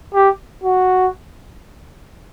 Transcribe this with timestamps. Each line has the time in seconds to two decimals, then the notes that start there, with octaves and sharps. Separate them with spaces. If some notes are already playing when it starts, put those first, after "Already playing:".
0.14 G4
0.63 F#4